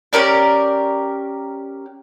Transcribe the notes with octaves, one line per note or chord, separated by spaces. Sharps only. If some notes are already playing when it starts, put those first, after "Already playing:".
C#4 G4 A#4 D5